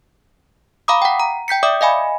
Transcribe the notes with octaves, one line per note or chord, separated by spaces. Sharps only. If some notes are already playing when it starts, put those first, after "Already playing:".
F5 A#5 B5 D6 D#6
F#5 G5
A#5
G5 G6 B6 C#7
D5 E5 D6 D#6
D#5 F5 G#5 B5